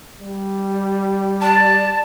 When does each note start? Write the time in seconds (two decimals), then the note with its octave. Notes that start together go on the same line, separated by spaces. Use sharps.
0.19 G3
1.41 D5 A5